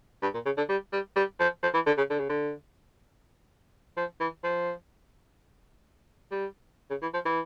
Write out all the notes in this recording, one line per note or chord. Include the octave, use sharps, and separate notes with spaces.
G2
A#2
C#3
D3
G3
G3
G3
F3
F3
E3
D3
C#3
D3
C#3
D3
F3
E3
F3
G3
C#3
E3
F3
E3